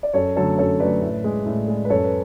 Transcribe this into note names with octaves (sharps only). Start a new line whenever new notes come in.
D5
F#2 A4 C#5
D3 F#3 A3 A4 C#5
F#2 A4 C#5
D3 F#3 A3 B4 D5
A2
G#3
A2
G#3
B4
F#2 A4 C#5
B4